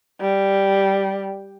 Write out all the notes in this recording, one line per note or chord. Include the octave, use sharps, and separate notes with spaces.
G3